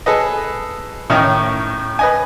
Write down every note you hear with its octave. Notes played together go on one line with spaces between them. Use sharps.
G#4 A4 B4 D#5
A2 D#3 C#4 D#5 F6
B4 D#5 G#5